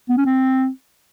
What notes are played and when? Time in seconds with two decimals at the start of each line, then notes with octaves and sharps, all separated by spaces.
0.09 B3
0.17 C#4
0.26 C4